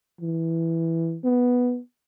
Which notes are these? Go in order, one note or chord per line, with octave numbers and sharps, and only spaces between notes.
E3
B3